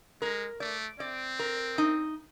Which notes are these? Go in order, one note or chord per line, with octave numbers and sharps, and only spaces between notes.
G#3 A#4
A3 D5
C4 D5
A#4
D#4